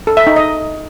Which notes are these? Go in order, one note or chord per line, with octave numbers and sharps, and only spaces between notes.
A4
E5
D#4
D#5